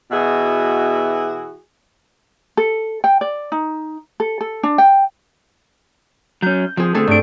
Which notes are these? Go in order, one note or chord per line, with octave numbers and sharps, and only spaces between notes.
B2 E3 E4 F#4 G#4
A4
G5
D5
D#4
A4
A4
D4
G5
F#3 C#4 G6
F3 C4 G#4
D3 A3 C4 G#4 A4
G2 A3 D4 D7